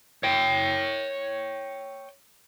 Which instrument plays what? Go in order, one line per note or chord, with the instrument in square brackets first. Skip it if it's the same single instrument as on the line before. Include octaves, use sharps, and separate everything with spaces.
[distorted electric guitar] C#5 G5